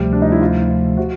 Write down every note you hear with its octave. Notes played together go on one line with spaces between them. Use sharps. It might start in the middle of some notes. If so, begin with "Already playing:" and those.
Already playing: D2 C3 F3 G3 A3
D4
D#4
E4
F4
F#4